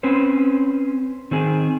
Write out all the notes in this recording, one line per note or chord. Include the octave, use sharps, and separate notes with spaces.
C4 C#4 B4 C5
D#3 C4 G#4